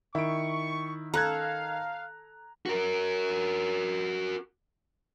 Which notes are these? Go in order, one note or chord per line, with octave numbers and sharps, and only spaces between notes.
D#3 E4 C#6 D7
A4 F5 A#5 F#6 G#6
F#4 A#4